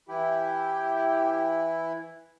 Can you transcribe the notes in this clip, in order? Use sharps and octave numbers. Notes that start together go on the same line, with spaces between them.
E3 E4 G4